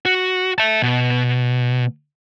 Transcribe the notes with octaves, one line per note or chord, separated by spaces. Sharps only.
F#4
E5 A5
B2